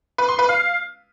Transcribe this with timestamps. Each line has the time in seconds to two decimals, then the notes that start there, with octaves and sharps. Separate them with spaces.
0.18 B4
0.29 C6
0.39 B4
0.49 F5